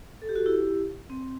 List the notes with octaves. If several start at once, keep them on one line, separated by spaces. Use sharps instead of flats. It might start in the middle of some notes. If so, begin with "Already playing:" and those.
A4
G4
F#4 A4
E4 G4
C4